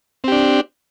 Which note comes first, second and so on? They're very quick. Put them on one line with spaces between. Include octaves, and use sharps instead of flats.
C4 G4 D4